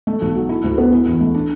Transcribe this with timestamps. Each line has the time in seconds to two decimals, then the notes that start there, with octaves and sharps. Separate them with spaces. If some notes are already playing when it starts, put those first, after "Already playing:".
0.07 A3
0.22 B1
0.35 F#3
0.49 E4
0.64 D2
0.78 B3
0.92 E4
1.07 E2
1.21 A3
1.34 D4